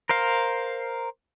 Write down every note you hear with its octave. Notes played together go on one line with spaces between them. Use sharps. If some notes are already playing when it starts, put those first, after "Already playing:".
A#4 C5 F5